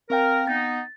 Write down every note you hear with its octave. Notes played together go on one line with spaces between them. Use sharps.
C4 A#4 F5 G5
B3 D#4 A6